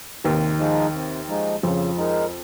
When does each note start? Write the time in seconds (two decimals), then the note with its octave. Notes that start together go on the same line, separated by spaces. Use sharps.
0.24 D#2 C3 D#3
0.59 F3 G#3 D#4
0.93 C3
1.28 F3 G#3 D#4
1.63 F2 C#3 F3
1.98 G#3 D#4 A#4